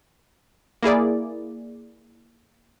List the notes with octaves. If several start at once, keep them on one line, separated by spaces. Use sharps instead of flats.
A#3 E4 G#4 D5